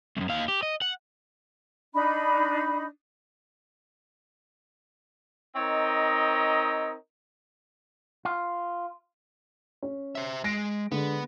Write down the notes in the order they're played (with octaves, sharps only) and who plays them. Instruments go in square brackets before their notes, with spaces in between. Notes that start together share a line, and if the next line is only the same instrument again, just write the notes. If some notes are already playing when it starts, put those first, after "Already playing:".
[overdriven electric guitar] C2 F#2
D#2 F5
G4
D#5
F#5
[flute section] D4 D#4 B5
[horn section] C4 D#4 A#4 C#5 D#5
[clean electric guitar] F4
[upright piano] C#4
[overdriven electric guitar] C5 E5
[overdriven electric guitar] G#3 [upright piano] A#6 D7
[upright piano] D3 G#3 [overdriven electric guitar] B3